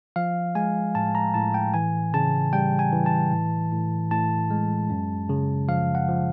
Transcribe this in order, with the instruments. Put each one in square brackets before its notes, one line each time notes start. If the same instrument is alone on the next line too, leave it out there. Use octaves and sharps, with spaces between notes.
[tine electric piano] F3 F5
G#3 G#5
A2 A5
A#5
A2 A5
G5
E3 G#5
C#3 A5
G3 G5
G#5
E3
A5
A2
A2
A2 A5
G#3
F#2
C#3
F3 F5
F#5
F3